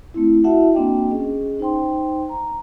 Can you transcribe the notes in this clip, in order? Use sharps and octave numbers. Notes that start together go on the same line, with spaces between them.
A3 C4 E4
E4 F#4 E5 F#5 A5
A#3 C4 D4 F#4 D#5 G5
C#4 G#4 D#5
D#4 C5 G5 C6
A#5